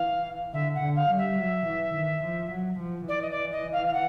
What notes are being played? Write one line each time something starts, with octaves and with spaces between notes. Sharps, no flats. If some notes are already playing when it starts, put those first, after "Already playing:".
Already playing: E3 F5
D3 E5
F#5
D3
F5
G3
E5
F#3
E3
D#3
F3
F#3
F3
E3 D5
D#5
D5
D#5
F5
F5
F#5